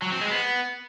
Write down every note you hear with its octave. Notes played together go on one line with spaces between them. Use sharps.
F#3
C4
G#3
B3